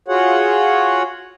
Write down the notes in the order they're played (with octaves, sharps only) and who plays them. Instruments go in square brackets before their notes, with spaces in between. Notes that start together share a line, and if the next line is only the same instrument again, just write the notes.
[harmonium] F4 F#4 G#4 C#5 F#5